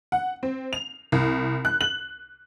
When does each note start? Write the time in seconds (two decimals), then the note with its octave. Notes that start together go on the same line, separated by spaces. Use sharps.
0.12 F#5
0.43 C4
0.73 F7
1.12 C2
1.65 F#6
1.81 F#7